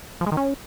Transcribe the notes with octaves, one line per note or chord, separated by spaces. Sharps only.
F3
G#3
D#3
C#4